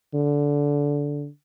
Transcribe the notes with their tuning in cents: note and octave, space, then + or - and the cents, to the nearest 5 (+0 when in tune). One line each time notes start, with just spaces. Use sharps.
D3 -15